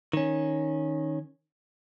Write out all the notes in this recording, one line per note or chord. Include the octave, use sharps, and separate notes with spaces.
D#3 C#4